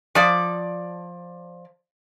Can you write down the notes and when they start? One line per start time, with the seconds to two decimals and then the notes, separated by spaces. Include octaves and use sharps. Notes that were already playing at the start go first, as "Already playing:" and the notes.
0.15 F3 D5